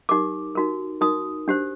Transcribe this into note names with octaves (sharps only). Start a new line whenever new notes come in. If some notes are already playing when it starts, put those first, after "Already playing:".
D#4 G4 A#4 D6
D#4 F#4 A#4
D#4 F#4 A#4 D#6
D4 G4 C5